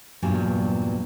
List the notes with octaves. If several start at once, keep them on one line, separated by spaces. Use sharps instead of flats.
E2 G2 A#2 F#3 G3 G#5